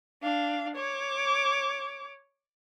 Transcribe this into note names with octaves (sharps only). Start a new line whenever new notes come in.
D4 F5
C#5 D6